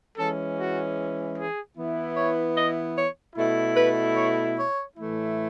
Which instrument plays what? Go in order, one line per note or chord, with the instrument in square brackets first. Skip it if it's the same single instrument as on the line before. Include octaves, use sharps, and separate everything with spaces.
[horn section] E3 G#3 C#4 A4
F#4
G#4
E3 B3 E4
C#5
D#5
C#5
B2 A3 E4
B4
C#5
C#5
A2 E3 A3 E4